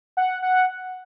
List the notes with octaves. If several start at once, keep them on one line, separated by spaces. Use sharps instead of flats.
F#5
F#5